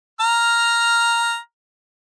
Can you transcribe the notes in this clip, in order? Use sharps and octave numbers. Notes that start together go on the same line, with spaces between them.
A#5 F6